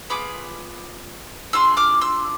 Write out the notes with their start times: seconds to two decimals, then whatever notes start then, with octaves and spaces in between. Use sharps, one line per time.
0.10 B3 F4 G#4 B5 D6
1.53 D4 F4 G#4 C6 E6
1.77 D6 F6
2.01 C6 E6